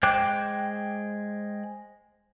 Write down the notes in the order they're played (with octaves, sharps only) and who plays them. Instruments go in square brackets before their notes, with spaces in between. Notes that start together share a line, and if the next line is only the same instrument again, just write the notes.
[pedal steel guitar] G#3 C5 G5 D6 F#6